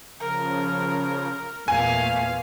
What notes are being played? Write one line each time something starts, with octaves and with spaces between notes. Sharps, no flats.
C#3 F3 A#4
E2 A#2 A3 F5 G#5